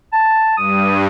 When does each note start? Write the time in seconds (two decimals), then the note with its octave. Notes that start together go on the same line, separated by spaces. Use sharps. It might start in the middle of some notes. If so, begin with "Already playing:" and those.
0.13 A5
0.57 G2 D#6